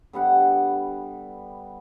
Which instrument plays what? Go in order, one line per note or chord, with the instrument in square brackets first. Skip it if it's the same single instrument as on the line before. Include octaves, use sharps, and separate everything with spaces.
[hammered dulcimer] D3 G3 B3 F#5